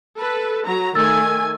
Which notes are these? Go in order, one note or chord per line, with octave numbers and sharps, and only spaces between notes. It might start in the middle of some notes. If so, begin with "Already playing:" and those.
A4 B4
F#3 A#5
D#3 A3 G#5 E6 A6